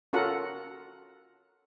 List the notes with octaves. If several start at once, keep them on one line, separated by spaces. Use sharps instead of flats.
C#4 F4 F#4 A4 A#4 F#5